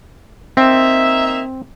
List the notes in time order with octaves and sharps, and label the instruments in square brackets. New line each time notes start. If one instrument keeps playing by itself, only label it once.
[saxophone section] A#3 D#4 E5 [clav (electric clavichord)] C4